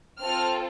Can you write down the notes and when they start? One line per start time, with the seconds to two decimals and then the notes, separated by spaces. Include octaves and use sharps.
0.20 C4 F4 A4 F6